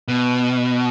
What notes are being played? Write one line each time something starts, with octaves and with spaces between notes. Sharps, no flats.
B2